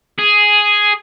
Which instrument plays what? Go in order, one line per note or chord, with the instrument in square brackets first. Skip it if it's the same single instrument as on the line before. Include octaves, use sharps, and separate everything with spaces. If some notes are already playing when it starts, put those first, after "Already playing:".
[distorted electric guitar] G#4